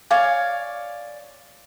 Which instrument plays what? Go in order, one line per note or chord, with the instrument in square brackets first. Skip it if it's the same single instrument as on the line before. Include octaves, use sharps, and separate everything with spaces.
[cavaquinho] C#5 D5 F5 G#5